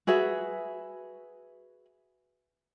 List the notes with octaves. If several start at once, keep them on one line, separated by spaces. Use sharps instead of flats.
F#4 G#4 B4 E5